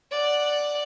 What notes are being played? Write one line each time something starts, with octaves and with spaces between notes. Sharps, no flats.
D5 F#5